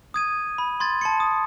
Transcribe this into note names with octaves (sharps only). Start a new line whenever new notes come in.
D#6 G#6 D#7
B5
C6 G#6 A6
A5 C6 C#7
D#6